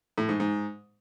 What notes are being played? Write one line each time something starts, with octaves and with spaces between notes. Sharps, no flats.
A2
G#2
G#2